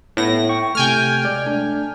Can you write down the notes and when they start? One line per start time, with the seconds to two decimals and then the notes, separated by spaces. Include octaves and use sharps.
0.17 A2 B3 E4 A#6
0.49 G5 C#6
0.75 C3 A3 G5 G#5 F6
1.25 G#3 D5
1.45 A3 D4